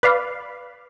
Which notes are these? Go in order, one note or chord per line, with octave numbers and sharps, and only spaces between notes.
B4 D5 F5